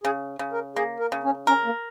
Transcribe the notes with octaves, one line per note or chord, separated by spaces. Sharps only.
C#3 G#4
C#3
A#4
A#3 G#4
A#4
C#3
C#4
C#4 A#4
A#3